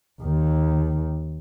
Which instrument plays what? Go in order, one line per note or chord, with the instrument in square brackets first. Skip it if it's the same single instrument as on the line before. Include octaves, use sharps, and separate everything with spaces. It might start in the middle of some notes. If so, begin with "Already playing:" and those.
[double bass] D#2 D#3